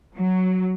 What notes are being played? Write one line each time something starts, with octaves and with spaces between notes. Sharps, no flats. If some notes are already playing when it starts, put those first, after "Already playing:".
F#3